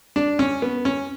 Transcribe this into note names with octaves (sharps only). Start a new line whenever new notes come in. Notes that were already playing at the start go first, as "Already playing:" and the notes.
D4
C#4
B3
C#4